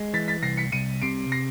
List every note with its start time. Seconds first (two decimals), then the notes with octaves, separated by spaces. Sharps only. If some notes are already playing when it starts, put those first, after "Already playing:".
Already playing: G#3
0.13 E3 A6 B6
0.28 A6 B6
0.43 C2 A#6 C7
0.57 B6 C#7
0.72 C2 C#7 D#7
1.01 C3 C7 D7
1.32 A#6 C7